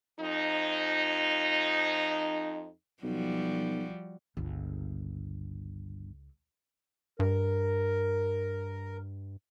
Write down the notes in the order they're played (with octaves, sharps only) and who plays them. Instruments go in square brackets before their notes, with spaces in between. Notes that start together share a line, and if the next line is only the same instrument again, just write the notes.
[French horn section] F2 F3 D#4
[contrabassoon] B1 [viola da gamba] F3 G3 F#4
[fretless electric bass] G1 [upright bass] C#2
[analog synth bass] G2 [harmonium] A#4